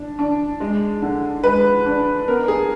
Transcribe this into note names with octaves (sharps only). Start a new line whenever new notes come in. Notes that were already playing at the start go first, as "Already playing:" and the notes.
Already playing: D4
D4
G#3
D3
G#3 B4
D4
B3 A#4
G#4